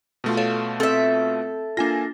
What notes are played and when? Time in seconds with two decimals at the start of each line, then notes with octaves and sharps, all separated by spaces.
0.24 B2 A3 F4
0.37 A4 C#5 F5
0.80 C4 A4 E5
1.77 A#3 D4 F4 G#5 A#6